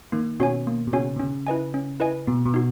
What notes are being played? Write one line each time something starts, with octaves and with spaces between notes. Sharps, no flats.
D#3 A#3
B2 C#4 F#4 C#5 G#5
A#3
B2
C#3 C#4 F#4 C#5 G#5
B2
C#3 C#4
E4 B4 D#5 G#5
C#4
E4 B4 D#5 G#5
B2 B3
B2
D#4 F#4